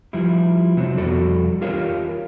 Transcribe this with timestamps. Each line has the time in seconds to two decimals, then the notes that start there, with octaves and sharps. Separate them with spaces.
0.13 F3 G3 E4
0.77 C3 F#3 B3 C4
0.98 F2 G3 F#4 A4 D5
1.61 F4 G4 A#4 C#5 F5